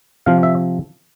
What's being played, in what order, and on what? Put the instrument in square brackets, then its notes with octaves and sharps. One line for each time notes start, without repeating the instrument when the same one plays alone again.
[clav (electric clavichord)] C3 F3 F5
E5